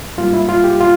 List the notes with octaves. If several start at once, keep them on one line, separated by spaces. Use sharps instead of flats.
G#2 G3 A#3 F4
E4
F4
G4
F4